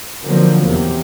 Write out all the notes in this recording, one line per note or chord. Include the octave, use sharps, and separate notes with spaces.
D3 F3 F#3 A#3 C4
E2 C3